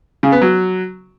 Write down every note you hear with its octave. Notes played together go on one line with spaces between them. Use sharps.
C#3
B3
F#3